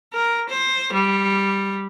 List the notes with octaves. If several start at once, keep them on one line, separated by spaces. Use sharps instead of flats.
A#4
C5
G3